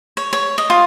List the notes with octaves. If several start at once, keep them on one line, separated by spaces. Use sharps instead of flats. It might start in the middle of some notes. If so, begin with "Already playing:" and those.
C#5
C#5
D#5
F4